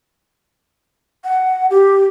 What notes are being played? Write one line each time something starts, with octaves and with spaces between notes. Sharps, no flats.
F#5
G4